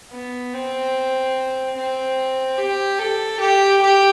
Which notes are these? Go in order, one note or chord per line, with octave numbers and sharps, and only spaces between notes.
B3
C4
C4
G4
A4
G4
G4